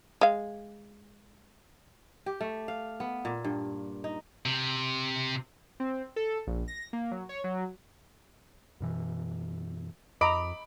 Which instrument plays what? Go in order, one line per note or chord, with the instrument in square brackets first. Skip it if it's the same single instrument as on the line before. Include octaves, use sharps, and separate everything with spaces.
[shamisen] G#3 F5
[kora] G4
A3
F5
B3
A#2
G2
D#4
[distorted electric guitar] C3
[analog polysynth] C4
A4
A#1
A#6
A#3
F#3
C#5
F#3
[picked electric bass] F#2 B2 E3
[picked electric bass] F2 [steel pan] D#5 A#5 [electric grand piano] B5 D6 D7